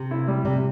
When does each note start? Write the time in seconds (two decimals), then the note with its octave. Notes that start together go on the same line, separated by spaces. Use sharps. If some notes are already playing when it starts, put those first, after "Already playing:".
Already playing: C3
0.11 E4
0.28 G3
0.45 C3 G3